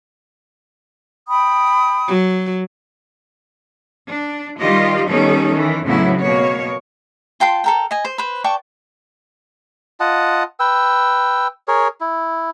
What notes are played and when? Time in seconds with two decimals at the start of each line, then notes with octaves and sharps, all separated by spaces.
1.28 G5 B5 D#6
2.08 F#3
4.09 D4
4.60 D#3 G3 F4 G4 D#5
5.08 D#3 G3 B3 C#4 D#4 A4
5.54 D#3 E3
5.84 F2 A2 C#3 F#3 B3 E4
6.19 B2 A#3 C#5
7.40 F4 G5 A5 C6
7.64 A4 A#4 G5
7.91 D#5 G#5
8.05 C5
8.18 B4 C5
8.44 D5 G5 A5 C#6
10.00 F4 D#5 F#5 A5
10.60 B4 G5 E6
11.68 G#4 A#4 C#5
12.01 E4